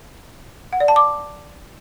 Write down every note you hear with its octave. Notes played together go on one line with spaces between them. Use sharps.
F#5
D5
A5
D6